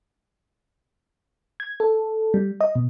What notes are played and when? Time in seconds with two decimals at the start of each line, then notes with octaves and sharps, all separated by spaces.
1.60 G#6
1.80 A4
2.34 G3
2.61 D#5
2.75 B2